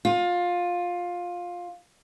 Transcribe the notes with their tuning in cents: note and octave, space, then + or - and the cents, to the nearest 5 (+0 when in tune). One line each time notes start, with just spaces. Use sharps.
F4 +15